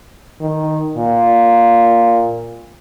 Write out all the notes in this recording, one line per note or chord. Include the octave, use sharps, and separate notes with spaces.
D#3
A#2